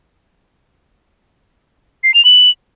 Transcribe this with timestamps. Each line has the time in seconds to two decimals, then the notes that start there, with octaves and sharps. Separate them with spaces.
2.04 C7
2.14 F7
2.25 F#7